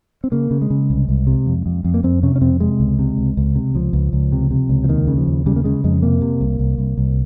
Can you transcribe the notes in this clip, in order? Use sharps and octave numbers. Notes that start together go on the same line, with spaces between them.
C4
C#3 A#3
C#3
G#3
C#3
C2
C2
C3
F2
F2
F2
A#3
F2 C4
C3 C#4
C#4
F2 C4
C3 G#3
C#2
C3
C#2
C#2
C3
C#2 F3
C#2
C#2
C3
C3
C#2
F3
D#2 D#3
C#3
F3
D#2
C#3 G3
A#3
C#3 G#3
F2 G#3
C3 A#3
C3
C2
C2
C2
C2